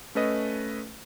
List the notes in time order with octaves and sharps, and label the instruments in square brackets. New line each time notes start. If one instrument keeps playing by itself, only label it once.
[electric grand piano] A3 C#4 A4 B4 D#5